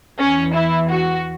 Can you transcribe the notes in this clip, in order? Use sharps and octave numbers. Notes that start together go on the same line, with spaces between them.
E2 E3 C#4
E4
F#4